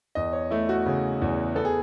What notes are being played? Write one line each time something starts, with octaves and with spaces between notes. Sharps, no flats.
E2 D#5
C#5
A3 E4
F#4
C#3
E2
B3 A4
G#4